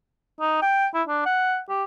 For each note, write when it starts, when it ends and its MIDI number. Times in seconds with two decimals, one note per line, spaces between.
0.41 0.59 63
0.62 0.87 79
0.94 1.02 64
1.08 1.24 62
1.26 1.60 78
1.69 1.84 67